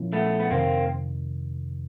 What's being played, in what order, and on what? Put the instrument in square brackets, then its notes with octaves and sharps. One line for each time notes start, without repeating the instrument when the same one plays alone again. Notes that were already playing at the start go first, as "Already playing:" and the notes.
Already playing: [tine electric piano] A#2 F3 A#3 C#4 E4
[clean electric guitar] A3 B3
B3
[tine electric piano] F2 C3 D#3 [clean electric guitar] A#3 C4